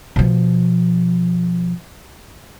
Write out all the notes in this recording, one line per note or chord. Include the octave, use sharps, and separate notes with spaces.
B2 F3